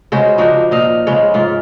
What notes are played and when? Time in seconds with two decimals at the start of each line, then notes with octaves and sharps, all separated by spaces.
0.12 C#3 G#3 F#4 C5
0.38 F3 D4 D#4 F#4
0.71 A#2 D#5 F5
1.07 C#3 G#3 C#5
1.34 G#2 F4